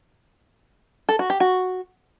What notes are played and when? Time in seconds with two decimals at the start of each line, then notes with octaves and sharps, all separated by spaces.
1.09 A4
1.19 F#4
1.30 G4
1.40 F#4